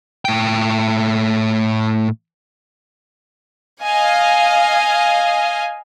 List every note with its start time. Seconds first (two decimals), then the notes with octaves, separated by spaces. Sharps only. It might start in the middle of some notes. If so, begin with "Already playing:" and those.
0.25 A2 G5
3.83 D#5 F5 G#5